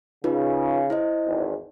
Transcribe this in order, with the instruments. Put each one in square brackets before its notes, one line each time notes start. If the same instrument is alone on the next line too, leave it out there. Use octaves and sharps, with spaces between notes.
[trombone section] C#3 [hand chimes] D#4 F4 B4
[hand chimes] E4 C5 D#5
[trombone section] G#1 E2